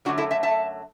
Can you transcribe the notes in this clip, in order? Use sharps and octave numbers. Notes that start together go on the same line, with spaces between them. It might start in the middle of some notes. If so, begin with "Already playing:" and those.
F#2 D3 F#3 A3 D4 F#4
E4 A4
E5 A5
E5 A5